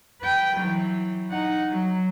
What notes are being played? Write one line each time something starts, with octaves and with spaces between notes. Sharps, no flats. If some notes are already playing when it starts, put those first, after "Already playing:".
B4 G5
E3 F#3
D#4 F#5
F#3